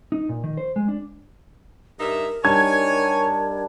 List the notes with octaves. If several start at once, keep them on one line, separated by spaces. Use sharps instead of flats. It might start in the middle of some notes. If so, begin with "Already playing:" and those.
D#4
A#2
D#3
C5
G#3
D4
G2 D#4 A#4 E5
G3 D4 D#4 C#5 G#5 G#6